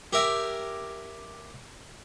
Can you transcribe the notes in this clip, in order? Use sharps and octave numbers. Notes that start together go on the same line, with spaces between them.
G4 A#4 E5 G#5